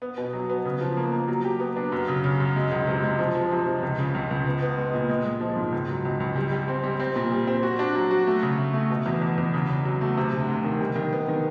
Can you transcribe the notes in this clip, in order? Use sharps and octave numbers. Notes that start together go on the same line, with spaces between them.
B3
B2
F#3
B3
C#3
F3
A#3
A#3
F#3
G4
B3
D4
F#2
C#3
C#3
F#2
G#3
C#2
C3
G#3
F3
F3
C3
F3
C#2
C#3
C#2
C#2
B3
B3
G#3
A#2
G#3
G#3
F3
G#2
C#2
F#3
C#2
C#2
G3
G3
C4
G3
C4
A#2
G3
C4
F#4
D4
F#3
F#4
A3
C#3
A3
A3
B2
E2
E2
E2
C#3
C#3
F#3
A3
C3
D2
D2
D#3
G3
D#3
B3
D#3